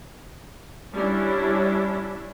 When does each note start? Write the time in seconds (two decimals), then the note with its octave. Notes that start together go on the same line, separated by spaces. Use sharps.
0.93 G3 C#4 D4 E4